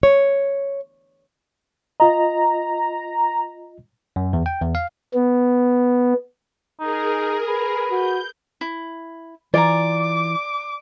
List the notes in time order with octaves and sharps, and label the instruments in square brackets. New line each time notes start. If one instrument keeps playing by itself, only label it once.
[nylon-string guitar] C#5
[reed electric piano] F4 D#5 [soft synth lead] A#5
[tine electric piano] F#2
E2
G5
E2
F5
[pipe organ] B3
[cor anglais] D#4 [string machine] G#4 A#4
[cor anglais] B4
[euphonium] F#4 [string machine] G6
[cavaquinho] E4
[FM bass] E3 [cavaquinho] F4 G#5 A#5 [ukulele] D5 [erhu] D6